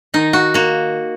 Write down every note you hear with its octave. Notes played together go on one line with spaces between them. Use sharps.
D#3 D#4
F#4
A#3 F#4